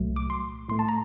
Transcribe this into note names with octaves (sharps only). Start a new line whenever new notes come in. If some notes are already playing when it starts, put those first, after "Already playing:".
Already playing: C2 A#2 F#3 A3
D6
C6
A2 A3 C6
A5
A#5